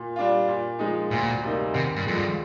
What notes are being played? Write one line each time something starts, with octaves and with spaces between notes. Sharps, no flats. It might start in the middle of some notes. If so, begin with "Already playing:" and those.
Already playing: A#2
G3 D4 F4
A#2
F3 G#3 D#4
D2 A#2
C3 G3 A#3 D#4
D#2 C3
G2
F2 D3 F3 G#3
G2